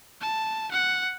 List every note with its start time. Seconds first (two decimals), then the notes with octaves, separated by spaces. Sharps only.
0.21 A5
0.71 F#5